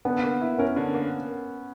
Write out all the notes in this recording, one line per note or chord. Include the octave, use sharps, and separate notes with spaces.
D3 B3
A#3
E4
C#4 A#4
D3
A#3